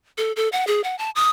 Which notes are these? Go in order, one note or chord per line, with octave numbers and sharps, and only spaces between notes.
A4
A4
F#5
G#4
F#5
A5
D#6